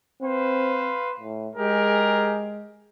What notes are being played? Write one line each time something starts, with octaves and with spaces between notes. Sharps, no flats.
C4 B4 C5 F5
A2
G#3 G4 G#4 A#4